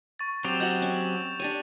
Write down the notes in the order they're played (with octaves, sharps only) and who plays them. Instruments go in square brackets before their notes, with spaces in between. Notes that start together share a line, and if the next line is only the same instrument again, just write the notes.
[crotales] C#6 A6
[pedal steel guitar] F#3 C4 G4 [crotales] E7 F7
[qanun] F#4 D#5 [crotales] G6 F#7
[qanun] C#4
[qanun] D4 G4 C#5 [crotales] A6 D#7